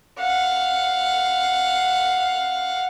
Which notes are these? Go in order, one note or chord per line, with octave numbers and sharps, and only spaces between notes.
F5 F#5